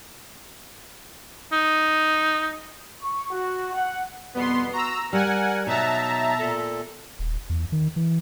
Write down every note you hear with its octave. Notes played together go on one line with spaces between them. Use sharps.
D#4
C#6
F#4
F#5
F2 B2 G3 B3 C6
F#4 A#5 E6
G3 A#4 F#5 G#5
B2 F#3 D#4 E5 A5 A#5
A#2 A4
D#1
E2
D#3
E3